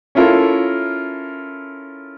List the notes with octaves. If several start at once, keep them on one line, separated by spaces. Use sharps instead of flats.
C#4 E4 F4 A4 A#4